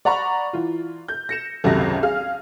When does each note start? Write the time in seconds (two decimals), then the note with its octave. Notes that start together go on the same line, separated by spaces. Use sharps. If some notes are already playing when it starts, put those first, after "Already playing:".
0.05 D5 F#5 A#5 B5 C#6
0.53 E3 F4
1.08 G6
1.29 A#6 C#7 E7
1.64 G#1 C#2 F#2 C3 A4 A#6
2.03 G#4 F5 F6